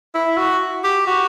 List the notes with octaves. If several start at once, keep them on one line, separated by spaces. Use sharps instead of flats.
E4
F#4
G4
F#4